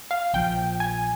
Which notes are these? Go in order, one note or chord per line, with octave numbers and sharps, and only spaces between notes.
F5
A#1 A#2 F3 G5
G#5